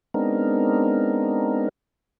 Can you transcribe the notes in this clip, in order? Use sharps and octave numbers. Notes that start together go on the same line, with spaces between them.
G#3 B3 C4 D4 D#4 A#4